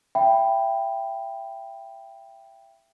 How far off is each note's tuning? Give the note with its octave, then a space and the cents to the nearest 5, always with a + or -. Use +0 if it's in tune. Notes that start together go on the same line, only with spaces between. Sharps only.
E5 +25 G5 +0 B5 +0